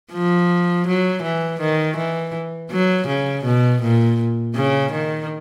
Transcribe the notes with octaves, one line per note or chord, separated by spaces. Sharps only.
F3
F#3
E3
D#3
E3
F#3
C#3
B2
A#2
C#3
D#3